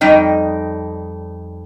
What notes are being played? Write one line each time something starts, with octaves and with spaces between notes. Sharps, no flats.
F2 G3 D#4 D#5 G5